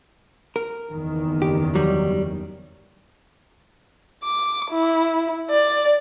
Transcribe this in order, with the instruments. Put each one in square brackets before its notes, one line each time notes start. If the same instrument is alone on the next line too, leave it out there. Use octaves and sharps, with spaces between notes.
[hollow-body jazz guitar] A#4
[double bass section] F#1 E2 D#3
[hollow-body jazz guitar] G4
F#3 G3
[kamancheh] D6
E4
D5